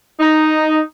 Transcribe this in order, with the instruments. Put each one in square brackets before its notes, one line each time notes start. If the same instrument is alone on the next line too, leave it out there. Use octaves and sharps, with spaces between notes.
[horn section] D#4